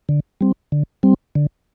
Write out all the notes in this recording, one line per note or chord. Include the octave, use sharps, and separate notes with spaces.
D3
G3 C4
D3
G3 C4
D3